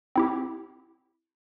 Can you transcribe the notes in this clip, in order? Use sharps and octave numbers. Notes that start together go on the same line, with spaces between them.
C4 E4 G4